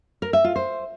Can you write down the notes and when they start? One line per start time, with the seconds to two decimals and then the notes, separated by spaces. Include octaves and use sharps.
0.22 A#4
0.33 E5
0.44 F4
0.56 C5